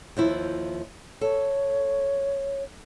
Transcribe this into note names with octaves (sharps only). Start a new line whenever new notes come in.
D#2 F3 E4
A4 C#5